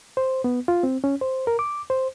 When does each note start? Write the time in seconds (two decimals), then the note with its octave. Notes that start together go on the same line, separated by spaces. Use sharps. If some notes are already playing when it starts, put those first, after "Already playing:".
0.17 C5
0.44 B3
0.68 F4
0.83 C4
1.04 C#4
1.21 C5
1.47 A#4
1.59 D6
1.90 C5